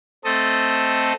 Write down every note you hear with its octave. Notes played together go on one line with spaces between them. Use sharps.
A3 C4 A4 D#5